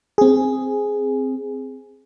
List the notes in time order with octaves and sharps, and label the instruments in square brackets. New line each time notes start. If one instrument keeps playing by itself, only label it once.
[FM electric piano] C4 G#4